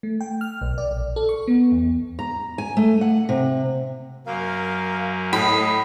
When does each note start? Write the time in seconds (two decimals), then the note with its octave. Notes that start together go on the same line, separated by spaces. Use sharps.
0.03 A3
0.21 G5
0.41 F6
0.61 B1
0.78 D5
0.91 A#1
1.16 A4
1.29 C#6
1.48 B3
1.72 E2
2.19 A#5
2.58 G#5
2.77 A3
3.01 F#5
3.29 C3
4.26 F#2 A#3 A#4 F5
5.33 A2 D#5 B5